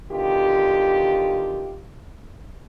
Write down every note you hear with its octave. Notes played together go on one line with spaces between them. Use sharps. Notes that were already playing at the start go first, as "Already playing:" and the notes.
B2 D3 D#3 F4 G4